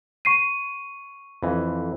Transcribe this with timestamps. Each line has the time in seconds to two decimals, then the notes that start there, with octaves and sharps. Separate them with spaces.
0.25 C#6 C7 D#7
1.43 F2 E3